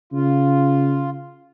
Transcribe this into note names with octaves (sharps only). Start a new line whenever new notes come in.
C#3 F4